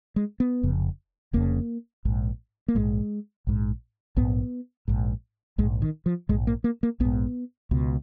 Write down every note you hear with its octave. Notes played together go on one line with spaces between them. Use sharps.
G#3
B3
F1 F2 C#3
F1 F2 C#3 A#3
A#1 G#2
A#3
A#1 G#2 G#3
A#1 G#2
A#1 G#2 B3
A#1 G#2
A#1 G#2 G#3
D#3
F3
A#1 G#2 G#3
A#3
A#3
A#3
A#1 G#2 B3
C#2 B2